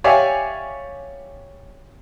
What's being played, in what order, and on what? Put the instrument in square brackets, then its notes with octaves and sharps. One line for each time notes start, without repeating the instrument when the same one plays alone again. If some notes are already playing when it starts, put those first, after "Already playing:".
[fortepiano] G4 C#5 D5 E5 F5 G#5